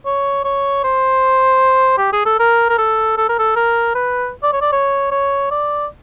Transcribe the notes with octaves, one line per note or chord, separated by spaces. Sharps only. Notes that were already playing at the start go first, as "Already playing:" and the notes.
C#5
C#5
C5
G4
G#4
A4
A#4
A#4
A4
A4
A#4
A4
A#4
B4
D5
C#5
D5
C#5
C#5
D5